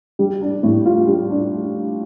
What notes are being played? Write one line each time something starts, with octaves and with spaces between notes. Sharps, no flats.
G3
D4
A2
F4
G3
D4